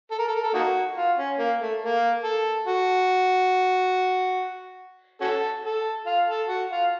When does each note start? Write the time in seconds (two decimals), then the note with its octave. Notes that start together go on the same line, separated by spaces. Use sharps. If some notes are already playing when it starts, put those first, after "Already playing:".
0.11 A4
0.19 A#4
0.27 A4
0.35 A#4
0.43 A4
0.54 A#3 D#4 F#4
0.96 F4
1.17 C#4
1.38 A#3
1.60 A3
1.81 A#3
2.24 A4
2.67 F#4
5.21 C#4 F#4 A4
5.64 A4
6.06 F4
6.28 A4
6.48 F#4
6.70 F4